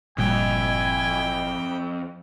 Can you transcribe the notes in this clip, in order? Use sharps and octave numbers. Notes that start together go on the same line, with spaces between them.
G1 F2 A#2 G3 E4 G5 G#5